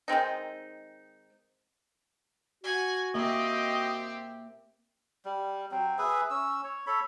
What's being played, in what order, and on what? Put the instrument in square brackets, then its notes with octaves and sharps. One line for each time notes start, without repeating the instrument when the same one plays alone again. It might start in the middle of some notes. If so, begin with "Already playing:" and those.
[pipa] D#3 G#3 C4 D#4
[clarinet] F#4 [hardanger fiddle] F#5 G#5
[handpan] A#3 A#4 E5 [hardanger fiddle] C4 G4 [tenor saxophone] D#5
[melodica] G3
F#3 C4
G#4 B4 E5
C#4 E6
C#5
A4 C#5 B5